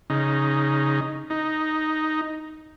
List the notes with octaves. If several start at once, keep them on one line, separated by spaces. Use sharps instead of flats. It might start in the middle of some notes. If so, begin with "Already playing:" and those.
C#3 D#4
D#4